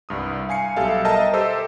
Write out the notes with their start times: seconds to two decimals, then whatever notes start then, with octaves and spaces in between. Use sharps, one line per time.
0.09 C2 G2 D#6
0.49 F5 G#5 C7 C#7
0.76 B1 G3 A4 E5 F5
1.05 A#4 D#5 E5 G5 A5 A#5
1.33 G4 A4 C5 E5 E6